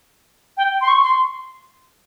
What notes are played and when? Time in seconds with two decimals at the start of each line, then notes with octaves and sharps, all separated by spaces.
0.57 G5
0.81 C6
0.88 C#6
1.03 C6